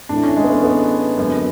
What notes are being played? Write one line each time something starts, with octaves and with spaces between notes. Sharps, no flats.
A1 A2 E3 D4
C#4
G#3
B3
A3
B3
G#1 F#2 D3